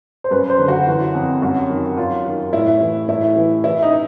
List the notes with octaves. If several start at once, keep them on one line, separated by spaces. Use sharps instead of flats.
C5
F#2 B4
C5
D3
F#4
E3
F2
F#2 F#4
D#3
F#2 F4
D#3
A2 E4
E3
A2 E4
E3
E3 E4
D#4